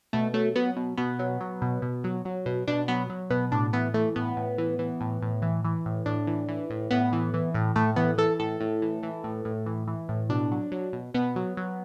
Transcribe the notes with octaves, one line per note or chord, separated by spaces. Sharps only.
B2 A3
F#3 A3
F#3 B3
B2
B2 B3
F#3
F#3
B2
B2
F#3
F#3
B2
B2 D4
F#3 B3
F#3
B2 B3
A2 D4
E3 B3
E3 A3
A2 B3
A2
E3
E3
A2
A2
E3
E3
A2
A2 D4
E3
E3
A2
A2 B3
E3
E3
A2
A2 A3
E3 B3
E3 A4
A2 A4
A2
E3
E3
A2
A2
E3
E3
A2
B2 D4
F#3
F#3
B2
B2 B3
F#3
F#3